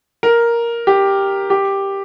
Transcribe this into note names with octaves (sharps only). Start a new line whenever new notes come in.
A#4
G4
G4